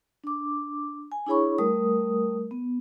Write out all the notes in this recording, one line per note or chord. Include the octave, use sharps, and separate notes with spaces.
D4 D6
G#5
D4 E4 G#4 C#5 B5 C#6
G3 A3 A#4 D#6
B3